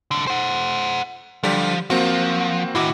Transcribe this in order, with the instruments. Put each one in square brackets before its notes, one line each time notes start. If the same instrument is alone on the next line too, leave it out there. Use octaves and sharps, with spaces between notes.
[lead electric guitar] C2 D3
C5 F#5
[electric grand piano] D3 G3 G4 [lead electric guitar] F3
[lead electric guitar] F3 [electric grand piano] A#3 C4 F#4
[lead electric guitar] A2 D#3 [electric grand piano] E4 F#4 D6